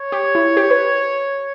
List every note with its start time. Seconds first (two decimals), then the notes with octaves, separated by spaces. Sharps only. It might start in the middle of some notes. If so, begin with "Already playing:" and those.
Already playing: C#5
0.12 G4
0.35 E4
0.57 G4
0.70 B4